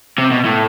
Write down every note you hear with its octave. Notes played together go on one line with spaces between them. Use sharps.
C3
B2
A2